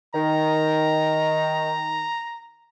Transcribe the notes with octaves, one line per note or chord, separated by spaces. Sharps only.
D#3 A#5